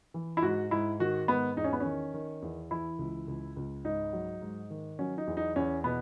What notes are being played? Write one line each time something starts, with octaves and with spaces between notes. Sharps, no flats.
E3
E4
G#2 F#4
G#2 E4
D#3 F#4
G#2 B3
E2 D#4
C#4
B3
D#3 C#4
D#3
E2
E3 E4
C#2
C#2
C#2
G#2 D#4
F#3
G#2
D#3
F#3 C#4
D#4
E2
D#4
E2 C#4
B2 B3